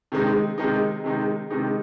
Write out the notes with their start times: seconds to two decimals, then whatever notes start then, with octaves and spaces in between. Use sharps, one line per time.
0.12 C3 D#3 G#3 D#4
0.58 C3 D#3 G#3 D#4
1.04 C3 D#3 G#3 D#4
1.50 C3 D#3 G#3 D#4